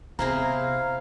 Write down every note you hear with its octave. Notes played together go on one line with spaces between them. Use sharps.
C3 B3 C4 E4 G#4 F5 A#5